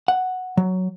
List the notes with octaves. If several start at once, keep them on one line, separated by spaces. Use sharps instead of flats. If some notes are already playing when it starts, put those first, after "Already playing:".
F#5
F#3